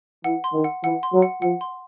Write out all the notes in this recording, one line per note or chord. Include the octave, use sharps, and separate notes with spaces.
E3 F#5
C6
D#3
F#5
E3 F#5
C6
F#3
F#5
F3 F#5
C6